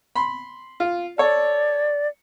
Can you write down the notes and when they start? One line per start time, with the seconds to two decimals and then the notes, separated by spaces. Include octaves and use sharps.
0.16 B5 C6
0.80 F4
1.18 A4 C#5 D5